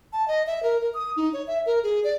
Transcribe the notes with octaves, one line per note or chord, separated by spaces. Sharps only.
A5
D#5
E5
A#4
A#4
D#6
D#4
C#5
E5
A#4
G#4
D5